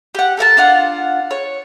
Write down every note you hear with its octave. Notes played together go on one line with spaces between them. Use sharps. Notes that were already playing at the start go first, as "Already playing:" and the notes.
G4 F#5
A4 A#4 F#5 A5
D4 F4 F5 F#5
C#5